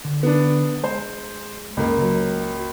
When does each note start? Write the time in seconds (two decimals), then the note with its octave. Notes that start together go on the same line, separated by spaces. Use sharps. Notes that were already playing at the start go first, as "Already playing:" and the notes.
0.05 D3
0.23 B3 D4
0.84 G#3 C5
1.77 C#2 C#3 A#3
2.02 F#3